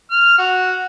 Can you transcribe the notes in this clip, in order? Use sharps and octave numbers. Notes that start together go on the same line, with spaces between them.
F6
F#4